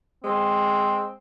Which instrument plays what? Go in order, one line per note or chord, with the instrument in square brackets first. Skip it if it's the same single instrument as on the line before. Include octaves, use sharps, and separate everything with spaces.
[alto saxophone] G#3 [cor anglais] C4